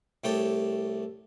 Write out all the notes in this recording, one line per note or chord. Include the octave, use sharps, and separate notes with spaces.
C2 A3 G4 C#5 A5